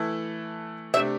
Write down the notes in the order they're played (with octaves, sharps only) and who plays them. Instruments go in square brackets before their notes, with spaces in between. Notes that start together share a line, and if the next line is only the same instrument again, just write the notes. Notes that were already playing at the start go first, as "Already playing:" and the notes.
Already playing: [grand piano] E3 A3 E4 A4
[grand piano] C3 A3 D4 G4 [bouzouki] E5